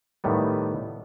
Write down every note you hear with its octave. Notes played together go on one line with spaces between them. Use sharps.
A2 D#3 G3 B3